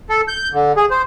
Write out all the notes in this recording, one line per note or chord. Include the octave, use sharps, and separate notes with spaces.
A4
G6
D3
G#4
C5